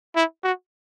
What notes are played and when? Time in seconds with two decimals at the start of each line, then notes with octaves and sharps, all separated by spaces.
0.16 E4
0.43 F#4